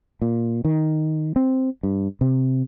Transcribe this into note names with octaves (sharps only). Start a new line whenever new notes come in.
A#2
D#3
C4
G2
C3